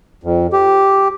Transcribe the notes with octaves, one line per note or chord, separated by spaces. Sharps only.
F2
G4